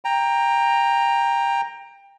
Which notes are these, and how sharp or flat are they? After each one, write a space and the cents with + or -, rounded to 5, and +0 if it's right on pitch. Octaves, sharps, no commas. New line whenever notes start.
G5 +20 A#5 +0